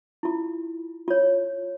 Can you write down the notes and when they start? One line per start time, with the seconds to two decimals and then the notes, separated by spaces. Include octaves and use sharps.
0.23 E4 F4
1.08 F4 C#5